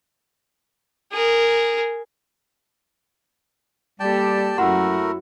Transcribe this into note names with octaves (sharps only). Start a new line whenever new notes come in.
G#4 A#4
G3 A#3 G4 A4 D5 G5 A5
F#2 A3 E4 F#4 A#4 F#5 A#5 C6